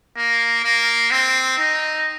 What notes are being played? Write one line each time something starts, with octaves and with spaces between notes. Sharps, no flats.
A#3
A#3
C4
D#4